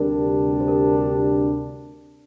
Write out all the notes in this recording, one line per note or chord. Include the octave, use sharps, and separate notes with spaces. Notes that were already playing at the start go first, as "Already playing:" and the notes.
Already playing: D2 C3 G3 D4 A#4
C5
A#4